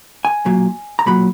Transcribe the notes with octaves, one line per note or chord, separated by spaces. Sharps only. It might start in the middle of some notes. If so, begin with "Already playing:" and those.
G#5
B1 A#2 F#3
A#5
B1 A#2 F#3 B5